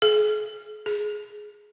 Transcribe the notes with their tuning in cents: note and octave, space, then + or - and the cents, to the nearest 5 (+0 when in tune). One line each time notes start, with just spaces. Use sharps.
G#4 +35
G#4 +10